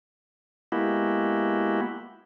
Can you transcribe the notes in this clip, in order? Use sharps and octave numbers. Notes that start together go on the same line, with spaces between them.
G#3 A#3 B3 E4 F#4 G4